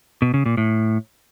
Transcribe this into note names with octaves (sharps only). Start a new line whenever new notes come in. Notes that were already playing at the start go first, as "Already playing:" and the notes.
B2
C#3
A#2
A2